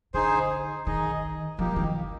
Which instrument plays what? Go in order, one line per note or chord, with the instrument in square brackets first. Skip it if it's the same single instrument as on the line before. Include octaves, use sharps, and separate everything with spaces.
[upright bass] D3 [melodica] D#4 G#4 C5
[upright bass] D#3 [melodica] D#4 G#4 D#5
[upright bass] F3 [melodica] A#3 D#4 G4
[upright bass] D#3